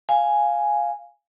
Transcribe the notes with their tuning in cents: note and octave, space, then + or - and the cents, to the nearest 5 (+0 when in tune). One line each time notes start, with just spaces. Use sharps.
F5 +0 G#5 +0